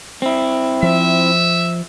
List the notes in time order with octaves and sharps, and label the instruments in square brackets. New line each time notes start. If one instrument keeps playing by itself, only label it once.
[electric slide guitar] C4 E4
[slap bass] F3 [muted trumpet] E5